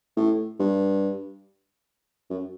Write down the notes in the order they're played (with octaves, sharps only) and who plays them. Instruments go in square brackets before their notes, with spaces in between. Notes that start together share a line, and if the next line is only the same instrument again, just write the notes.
[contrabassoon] A2
G2
F#2